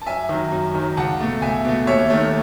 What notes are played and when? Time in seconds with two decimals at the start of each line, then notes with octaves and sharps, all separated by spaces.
0.02 A5
0.06 F#2 E5 G#5
0.29 D#3 F#3
0.52 F#2
0.74 D#3 F#3
0.97 C#2 F#5 A5
1.20 B2 A3
1.42 C#2 E5 G#5
1.65 B2 A3
1.87 D#2 C#5 E5
2.10 D#3 A3